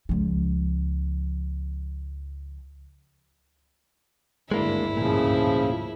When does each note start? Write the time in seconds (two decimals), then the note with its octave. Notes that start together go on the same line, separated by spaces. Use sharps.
0.09 C#2 F3
4.51 G#1 D2 G2 G#3 A#3 D4 E4
4.97 A#2 C#3 F3